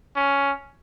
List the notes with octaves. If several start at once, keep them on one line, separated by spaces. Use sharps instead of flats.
C#4